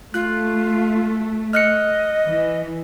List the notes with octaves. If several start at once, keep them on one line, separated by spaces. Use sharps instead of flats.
A3 F4 F#6
D#5 F6 F#6 C#7
E3